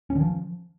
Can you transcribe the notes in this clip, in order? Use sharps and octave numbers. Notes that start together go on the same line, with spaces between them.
C#4
D#3
F3